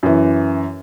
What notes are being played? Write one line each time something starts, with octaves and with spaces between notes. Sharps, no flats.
F#2 E3